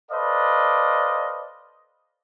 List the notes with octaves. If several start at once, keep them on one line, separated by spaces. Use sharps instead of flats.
A4 B4 C5 D5 D#5 F5